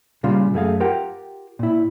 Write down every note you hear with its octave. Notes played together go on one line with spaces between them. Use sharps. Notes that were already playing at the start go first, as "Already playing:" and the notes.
A#2 C#3 G3 F4 F5 C6
F#2 A3 G#4 F5
F4 G4 A#4 F#5 G5
A#2 E4